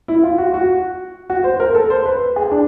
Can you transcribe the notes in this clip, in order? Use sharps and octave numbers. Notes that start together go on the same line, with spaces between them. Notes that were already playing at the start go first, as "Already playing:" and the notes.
E4
F4
F#4
F#4
F#4
C5
A#4
A4
C5
B4
G#4
D4